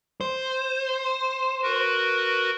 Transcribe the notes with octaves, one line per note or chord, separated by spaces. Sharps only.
C5
F#4 A#4 B4